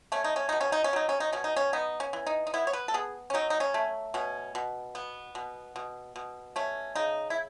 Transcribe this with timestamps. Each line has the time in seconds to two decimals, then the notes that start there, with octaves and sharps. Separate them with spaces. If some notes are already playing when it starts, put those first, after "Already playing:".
0.12 A3 C#4
0.24 D#4
0.36 C#4
0.49 B2 D#4
0.61 C#4
0.72 D#4
0.84 C#4
0.93 F#3 D#4
1.09 C#4
1.20 D#4
1.33 B2 C#4
1.44 D#4
1.56 C#4
1.73 B3 D#4
2.00 C#4
2.13 E3
2.27 D#4
2.47 D#4
2.54 B3 E4
2.67 C#5
2.73 B4
2.88 A4
2.94 B3 G#4
3.30 C#4
3.34 F#3 D#4
3.50 D#4
3.60 C#4
3.74 A3
4.14 B2 C#4
4.55 B2
4.95 B3
5.35 B2
5.76 B2
6.16 B2
6.56 A3 C#4
6.95 C#3 D#4
7.30 E4